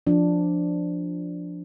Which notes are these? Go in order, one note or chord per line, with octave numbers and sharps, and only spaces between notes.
F3 D4